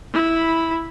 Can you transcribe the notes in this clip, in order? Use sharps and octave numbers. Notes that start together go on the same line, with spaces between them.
E4 B5